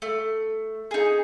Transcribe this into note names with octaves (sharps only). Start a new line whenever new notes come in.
A3
D#4 G#4